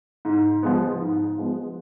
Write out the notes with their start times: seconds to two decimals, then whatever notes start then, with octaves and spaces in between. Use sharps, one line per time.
0.25 G#2
0.63 F3 G#3 B3
1.01 G#2
1.38 F3 G#3 B3